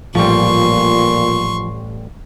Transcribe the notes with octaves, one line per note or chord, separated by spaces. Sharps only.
A1 A#2 F3 G3 C6 C#6